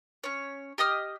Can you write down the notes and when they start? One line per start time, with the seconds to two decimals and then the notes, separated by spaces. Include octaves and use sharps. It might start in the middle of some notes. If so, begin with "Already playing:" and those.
0.24 C#4 C#5
0.78 G4 D#5 D#6 F6